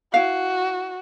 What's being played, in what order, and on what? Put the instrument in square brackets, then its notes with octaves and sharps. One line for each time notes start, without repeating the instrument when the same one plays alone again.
[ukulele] E4 F5 [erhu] F#4